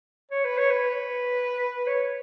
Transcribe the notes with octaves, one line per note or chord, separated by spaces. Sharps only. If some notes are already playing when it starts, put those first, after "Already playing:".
C#5
B4
C#5
B4
C#5